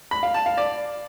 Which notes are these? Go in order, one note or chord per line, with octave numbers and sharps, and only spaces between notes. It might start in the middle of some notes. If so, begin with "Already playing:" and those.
B5
F5
A5
F5
D5